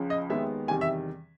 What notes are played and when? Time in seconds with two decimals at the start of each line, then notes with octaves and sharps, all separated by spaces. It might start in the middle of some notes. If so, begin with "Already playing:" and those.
Already playing: C#2 C#3 F3
0.10 D#5
0.30 D#2 D#3 G#3 B3 E5
0.68 E2 C3 D#3 G3 G#5
0.81 E5